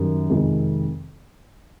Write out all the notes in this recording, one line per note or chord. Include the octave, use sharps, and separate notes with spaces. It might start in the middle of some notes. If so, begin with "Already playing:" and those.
Already playing: F#2 D#3 G3
F2 C3 D#3 G#3